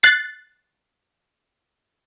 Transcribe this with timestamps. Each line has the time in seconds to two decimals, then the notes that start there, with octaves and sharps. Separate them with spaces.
0.03 F#6 A6 C7